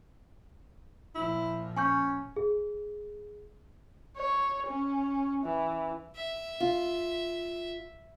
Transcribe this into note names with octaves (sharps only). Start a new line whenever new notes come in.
A#2 F3 E4
C#4 G#5 C#6 G6
G#4
C#5
C#4
E3
E5
F4